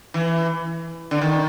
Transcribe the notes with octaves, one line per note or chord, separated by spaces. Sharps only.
E3
D3
D#3